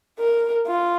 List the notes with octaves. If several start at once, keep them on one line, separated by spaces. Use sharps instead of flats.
A#4
F4